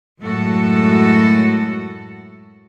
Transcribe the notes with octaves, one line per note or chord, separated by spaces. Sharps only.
F#2 A2 G#3 F#4 A4